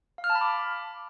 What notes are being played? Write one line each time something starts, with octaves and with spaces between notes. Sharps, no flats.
F5
F6
A5
B5
D6